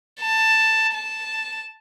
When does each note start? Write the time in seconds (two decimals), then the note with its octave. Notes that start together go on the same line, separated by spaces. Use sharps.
0.20 A5
0.94 A5